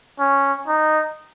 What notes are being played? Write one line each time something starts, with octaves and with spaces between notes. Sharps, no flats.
C#4
D#4